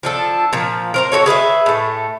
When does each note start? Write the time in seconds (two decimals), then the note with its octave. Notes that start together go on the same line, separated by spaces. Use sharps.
0.03 F3 D4 A4
0.53 A#2 F3
0.94 A#4 C5 A#5
1.12 F#4 G4 A4 C#5
1.26 G#4 B4 D5 E5
1.66 A2 A3